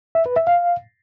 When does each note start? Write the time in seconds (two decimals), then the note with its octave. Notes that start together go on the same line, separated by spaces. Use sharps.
0.15 E5
0.26 B4
0.36 E5
0.47 F5